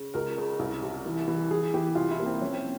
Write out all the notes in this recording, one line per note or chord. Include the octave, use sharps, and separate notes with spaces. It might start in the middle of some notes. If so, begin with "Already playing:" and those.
Already playing: C#3
C#2 A#4
C#3
C2
C3
E3
E3
E3 G#4
E3 G4
C2 F4
E4
C3 A#3
C4
F3 C#4
C4